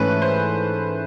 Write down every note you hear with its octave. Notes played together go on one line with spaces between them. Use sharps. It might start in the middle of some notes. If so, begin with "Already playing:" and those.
Already playing: G#2 E3 A3 C#4 B4
C5